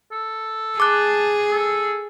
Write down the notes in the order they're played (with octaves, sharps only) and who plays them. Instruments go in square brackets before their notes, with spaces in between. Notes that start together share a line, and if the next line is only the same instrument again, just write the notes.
[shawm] A4
[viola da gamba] G#4 [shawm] A5 [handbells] D6 F#6
[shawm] A4